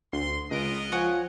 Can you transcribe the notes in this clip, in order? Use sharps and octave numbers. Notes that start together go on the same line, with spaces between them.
D2 C6
C#2 B3 A#4 D#5 D7
F3 C#5 F#5 G#5